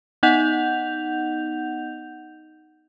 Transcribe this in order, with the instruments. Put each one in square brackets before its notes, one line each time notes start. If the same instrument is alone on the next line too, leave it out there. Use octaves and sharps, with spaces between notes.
[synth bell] B3 D#4 D#5 F#5 G6 F7